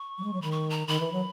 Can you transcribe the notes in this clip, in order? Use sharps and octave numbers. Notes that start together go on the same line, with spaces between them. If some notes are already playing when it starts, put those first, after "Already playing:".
Already playing: C#6
F#3
G#3
F#3
D#3 B5
C#6
A#5
D#3 B5
E3
F#3